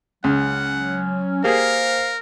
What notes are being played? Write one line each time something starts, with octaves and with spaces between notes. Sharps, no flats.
C#2 F#3 C#4 F#5
A#3 G4 G#4 A#4 C5 F5